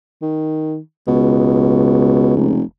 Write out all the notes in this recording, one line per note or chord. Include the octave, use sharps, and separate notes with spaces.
D#3
C#2 B2
F1